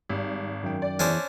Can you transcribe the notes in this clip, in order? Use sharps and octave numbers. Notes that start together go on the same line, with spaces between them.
G#1 G3
F#2 D#3 G5
D5
E2 C#4 D4 C5